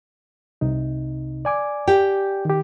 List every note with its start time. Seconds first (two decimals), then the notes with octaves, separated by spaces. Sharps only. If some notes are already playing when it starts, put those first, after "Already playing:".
0.61 C2 C3 D#4
1.45 D5 G#5 D6
1.87 G4 G5
2.45 D#3 G4